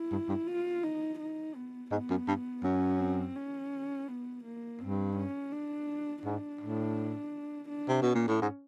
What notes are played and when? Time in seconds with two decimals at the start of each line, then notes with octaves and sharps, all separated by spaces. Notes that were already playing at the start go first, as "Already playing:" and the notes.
Already playing: E4
0.12 G2
0.29 G2
0.47 F4
0.83 D#4
1.20 D#4
1.55 B3
1.91 G#2 B3
2.10 F#2
2.28 G2
2.64 F#2 C#4
3.00 C4
3.36 C#4
4.08 B3
4.44 A#3
4.81 G2 C4
5.17 C#4
5.52 D4
6.25 G#2 D4
6.61 A2
7.69 D4
7.88 C3
8.02 B2 C#4
8.15 A#2
8.27 A2
8.42 G#2